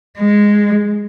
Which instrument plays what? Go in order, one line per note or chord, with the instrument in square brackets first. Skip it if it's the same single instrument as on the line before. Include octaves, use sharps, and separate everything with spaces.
[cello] G#3